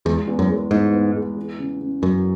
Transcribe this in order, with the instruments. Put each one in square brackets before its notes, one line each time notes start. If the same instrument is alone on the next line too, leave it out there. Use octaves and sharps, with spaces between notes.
[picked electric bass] E2 [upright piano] G#3
[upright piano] E2
[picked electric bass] F#2
[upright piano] G#3
[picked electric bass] G#2 [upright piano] B3
[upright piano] B3
G#3
E2
C#3
C#3
[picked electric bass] F#2 [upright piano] C#3